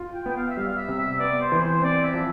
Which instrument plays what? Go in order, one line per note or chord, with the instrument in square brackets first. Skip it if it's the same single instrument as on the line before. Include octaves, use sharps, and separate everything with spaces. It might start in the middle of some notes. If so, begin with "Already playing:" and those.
Already playing: [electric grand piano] F4
[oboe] G5
[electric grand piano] B3
[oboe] G5
F5
E5
[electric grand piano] G3 [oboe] F5
[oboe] F5
E5
[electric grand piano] C3
[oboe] E5
[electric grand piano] B3 [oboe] D5
[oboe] C5
[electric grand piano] E3
[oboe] C5
C5
[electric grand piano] C4 [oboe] D5
[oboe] E5
[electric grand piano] F3